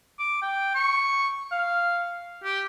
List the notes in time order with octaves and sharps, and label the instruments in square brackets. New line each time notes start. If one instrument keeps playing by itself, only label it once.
[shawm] D6
G5
C#6
F5
G4